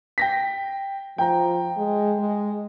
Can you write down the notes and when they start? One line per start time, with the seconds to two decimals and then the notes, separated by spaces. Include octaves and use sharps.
0.18 G5 A#6 B6
1.18 F3 G5 A#5
1.77 G#3
2.19 G#3